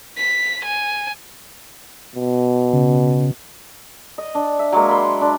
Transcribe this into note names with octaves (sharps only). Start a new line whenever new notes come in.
B6
G#5
B2
C#3
D#5
D4
E5
F#3 G#3 A#3
B5 C6
D4